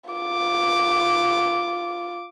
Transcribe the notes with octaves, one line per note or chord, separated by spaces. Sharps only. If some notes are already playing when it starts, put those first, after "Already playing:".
F4 D6